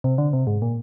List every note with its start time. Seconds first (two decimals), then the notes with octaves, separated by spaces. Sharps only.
0.04 C3
0.18 D3
0.33 C3
0.47 G#2
0.62 A#2